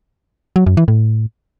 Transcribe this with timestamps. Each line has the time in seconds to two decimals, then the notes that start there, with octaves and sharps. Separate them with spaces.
0.56 F#3
0.66 F#2
0.77 E3
0.88 A2